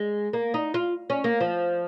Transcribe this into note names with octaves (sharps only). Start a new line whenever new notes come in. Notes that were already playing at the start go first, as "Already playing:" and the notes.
Already playing: G#3
A#3
D#4
F4
C#4
A#3
F3